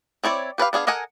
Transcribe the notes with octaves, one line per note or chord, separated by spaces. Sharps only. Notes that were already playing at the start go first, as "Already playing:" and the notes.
C4 E4 C#5 D5
G4 B4 D5 F5
B3 D4 G#4 F5
A4 A#4 D#5 F#5 G#5